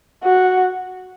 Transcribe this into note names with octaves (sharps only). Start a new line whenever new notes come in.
F#4